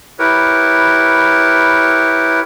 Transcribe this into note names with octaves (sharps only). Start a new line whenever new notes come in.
E4 G4 A#4 B4 C#5